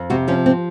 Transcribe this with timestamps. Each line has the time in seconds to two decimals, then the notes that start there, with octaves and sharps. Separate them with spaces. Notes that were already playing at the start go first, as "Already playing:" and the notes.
Already playing: F2
0.10 C3 F#4
0.28 F3 C#4
0.46 C4